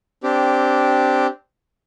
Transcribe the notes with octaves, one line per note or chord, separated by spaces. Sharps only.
C4 D4 G4